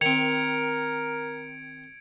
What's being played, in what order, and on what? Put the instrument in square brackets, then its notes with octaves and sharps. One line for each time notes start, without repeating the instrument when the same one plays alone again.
[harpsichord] D#3 C4 [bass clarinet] A#4 [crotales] G#6 D7 [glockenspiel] C#7 F7